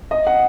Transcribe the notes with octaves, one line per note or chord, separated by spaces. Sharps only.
D#5
F#5